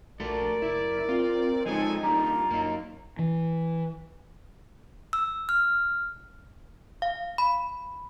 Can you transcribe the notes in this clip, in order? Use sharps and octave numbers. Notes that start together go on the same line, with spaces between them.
A#1 A3 F#4 A4 A#4 D5
F#1 E4
C4 F4
F3 G#3 C4 C#4 D#4 A4 G#5
G3 A#3 D4 F4 A#5
F#2 A#3 D#4
E3
E6
F6
F5
B5